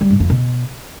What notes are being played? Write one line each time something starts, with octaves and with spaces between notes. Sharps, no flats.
G3
G#2
F2
B2